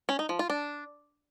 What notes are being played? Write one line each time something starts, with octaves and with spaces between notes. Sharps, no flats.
C#4
D#4
F3
F4
D4